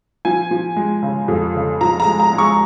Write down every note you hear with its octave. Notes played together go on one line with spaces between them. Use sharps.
F3 G#5
F3
G#3
C#3
F2
C#3
F3 A#5
A#5
G#3
A#5
G#3
C#6